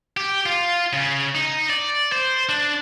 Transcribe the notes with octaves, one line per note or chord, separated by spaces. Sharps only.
G4
F4
C#3
D#4
D5
C5
D4